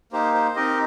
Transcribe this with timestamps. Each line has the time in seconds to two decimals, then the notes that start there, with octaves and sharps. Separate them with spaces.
0.13 A#3 D#4 G4 C5
0.34 C5
0.56 C4 D#4 G4 A#4 D#5